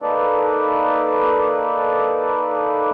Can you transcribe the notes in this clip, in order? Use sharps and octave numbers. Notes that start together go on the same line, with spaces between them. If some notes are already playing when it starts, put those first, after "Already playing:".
A#3 D#4 A4 B4 D5